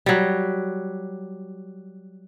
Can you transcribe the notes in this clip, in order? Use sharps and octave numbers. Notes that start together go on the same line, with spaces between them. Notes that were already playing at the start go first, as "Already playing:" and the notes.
F#3 G3